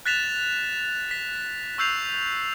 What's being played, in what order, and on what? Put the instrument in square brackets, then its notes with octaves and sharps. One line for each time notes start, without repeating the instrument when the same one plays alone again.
[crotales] F#6 A6 B6 E7 F7
B6
C#6 E6 G6 C7 F7